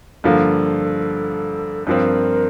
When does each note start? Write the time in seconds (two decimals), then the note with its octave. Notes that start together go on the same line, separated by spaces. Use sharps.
0.24 G2 D3 F3 A#3 A4
1.87 G2 F3 C4 A#4